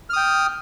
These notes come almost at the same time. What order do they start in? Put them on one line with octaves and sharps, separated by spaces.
F6 D#6 G5